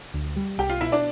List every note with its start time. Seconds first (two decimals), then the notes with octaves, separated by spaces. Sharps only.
0.14 D2
0.36 G3
0.58 C2 G4 G5
0.70 F4 F5
0.81 B2 E4 E5
0.92 D4 D5